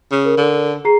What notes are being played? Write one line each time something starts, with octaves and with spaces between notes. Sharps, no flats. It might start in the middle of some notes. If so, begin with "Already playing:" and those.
C#3
A#4
D3
G#4 A#5 C7